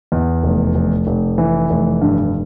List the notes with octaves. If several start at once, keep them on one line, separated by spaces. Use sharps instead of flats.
E2
F1
F1
F1
E3
F1
G2